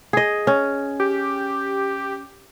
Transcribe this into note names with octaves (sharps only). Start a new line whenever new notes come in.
G#4 D#5
C#4
G4